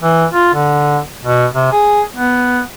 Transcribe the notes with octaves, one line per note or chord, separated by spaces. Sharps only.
E3
F4
D3
B2
C3
G#4
B3